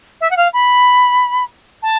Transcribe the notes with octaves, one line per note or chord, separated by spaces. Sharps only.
E5
F#5
F5
B5
A5